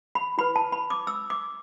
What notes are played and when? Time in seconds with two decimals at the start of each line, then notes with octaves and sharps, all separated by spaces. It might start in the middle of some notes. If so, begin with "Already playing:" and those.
0.15 B5
0.38 E4 B4 B5
0.56 A5
0.72 B5
0.90 D6
1.07 E6
1.30 D6